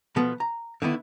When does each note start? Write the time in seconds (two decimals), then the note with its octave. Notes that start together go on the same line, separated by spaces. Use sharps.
0.16 B2 F3 B3 A4
0.40 A#5
0.82 D3 D#3 B3 E4